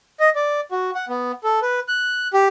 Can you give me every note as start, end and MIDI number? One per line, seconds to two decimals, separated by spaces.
0.20 0.30 75
0.36 0.61 74
0.72 0.91 66
0.95 1.05 78
1.09 1.32 59
1.44 1.60 69
1.62 1.80 71
1.88 2.28 90
2.33 2.48 67